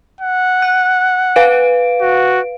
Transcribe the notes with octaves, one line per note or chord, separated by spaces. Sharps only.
F#5
F#6
B4 F5 D7
F#4